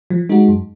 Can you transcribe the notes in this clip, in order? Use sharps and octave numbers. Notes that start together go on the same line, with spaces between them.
F3
G#3 D#4 F#4
F#2